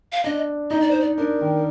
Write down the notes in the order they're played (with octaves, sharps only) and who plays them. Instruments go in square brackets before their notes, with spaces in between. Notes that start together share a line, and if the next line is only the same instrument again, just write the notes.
[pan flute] F5
[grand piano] D4 [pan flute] D#5
[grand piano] D#4 [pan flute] D#5
[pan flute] D5
C5
D5
[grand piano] D4 [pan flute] A#4
[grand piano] D#3